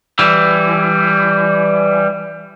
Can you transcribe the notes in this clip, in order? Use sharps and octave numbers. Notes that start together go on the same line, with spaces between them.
E3 G3